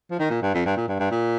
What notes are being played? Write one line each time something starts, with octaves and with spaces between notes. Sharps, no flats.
F3
D#3
A#2
G2
F2
G2
A#2
G2
G2
A#2